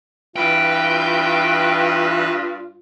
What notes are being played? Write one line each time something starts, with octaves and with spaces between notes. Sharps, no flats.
G2 E3 F4 B4 G5